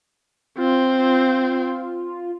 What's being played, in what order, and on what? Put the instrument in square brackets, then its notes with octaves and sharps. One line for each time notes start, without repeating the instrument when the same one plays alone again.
[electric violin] C4 [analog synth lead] F4